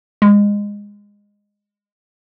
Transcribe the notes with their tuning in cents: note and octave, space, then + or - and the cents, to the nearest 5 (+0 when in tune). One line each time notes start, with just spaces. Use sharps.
G#3 -20